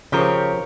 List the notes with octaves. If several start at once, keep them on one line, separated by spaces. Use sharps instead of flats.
C#3 F3 G4 A#4 C#5